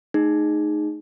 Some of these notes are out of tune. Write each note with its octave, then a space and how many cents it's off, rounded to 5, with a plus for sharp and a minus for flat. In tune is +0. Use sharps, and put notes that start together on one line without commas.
A3 -20 D#4 -15 G#4 +0